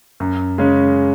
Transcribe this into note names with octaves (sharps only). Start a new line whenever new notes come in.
F#2
C#3 G#3 C#4